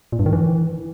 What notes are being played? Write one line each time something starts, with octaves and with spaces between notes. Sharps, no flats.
A#2
G2
D#3
E3